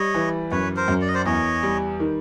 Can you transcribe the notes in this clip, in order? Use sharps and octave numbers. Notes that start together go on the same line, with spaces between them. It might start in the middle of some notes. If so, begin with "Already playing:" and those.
Already playing: G3 C#5 D#5
E3
F#2 B4 C#5
A#4 C5
F#2
D5
D#5
C5 D5
E2 C#5 D#5
G3
D#3